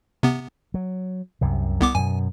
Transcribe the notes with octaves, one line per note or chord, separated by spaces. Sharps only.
C3 B3
F#3
C2 F#2 C3
C2 B3 D6
F#2 B2 G#5